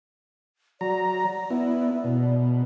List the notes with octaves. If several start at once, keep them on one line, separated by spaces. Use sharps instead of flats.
F#3 D5 A#5
B3 E4
B2